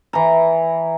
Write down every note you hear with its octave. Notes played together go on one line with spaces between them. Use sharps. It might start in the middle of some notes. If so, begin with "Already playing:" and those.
E3 A#5